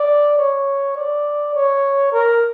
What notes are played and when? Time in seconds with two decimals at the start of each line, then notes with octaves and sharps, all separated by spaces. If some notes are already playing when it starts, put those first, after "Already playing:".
Already playing: D5
0.38 C#5
0.96 D5
1.55 C#5
2.13 A#4